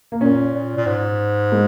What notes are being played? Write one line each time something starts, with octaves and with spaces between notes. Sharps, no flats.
A#3
A#2 C#4
A#2
A#2
G#2
G#3